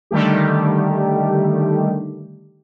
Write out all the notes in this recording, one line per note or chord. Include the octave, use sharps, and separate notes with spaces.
D3 D#3 G3 A3 G4